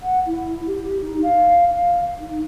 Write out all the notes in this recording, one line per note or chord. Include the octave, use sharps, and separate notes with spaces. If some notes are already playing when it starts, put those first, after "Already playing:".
F#5
E4
G4
D#4
F5
F5
D#4